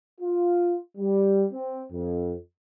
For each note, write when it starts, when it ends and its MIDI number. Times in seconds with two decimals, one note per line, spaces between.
0.21 0.77 65
0.98 1.45 55
1.53 1.82 60
1.92 2.35 41